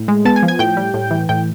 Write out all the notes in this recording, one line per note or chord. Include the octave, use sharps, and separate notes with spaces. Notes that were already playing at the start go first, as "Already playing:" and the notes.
Already playing: A2
G#3
B3 A5 A6
G#5 G#6
F3
G#5 G#6
A2 G5 G6
G3
A2
E3
A2 G5 G6